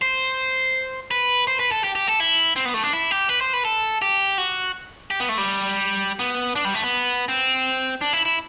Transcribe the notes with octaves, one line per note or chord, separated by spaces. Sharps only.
C5
B4
C5
B4
A4
G4
G4
A4
E4
C4
B3
A3
D4
E4
G4
B4
C5
B4
A4
G4
F#4
G4
B3
A3
G3
B3
D4
G3
A3
B3
C4
D4
E4
E4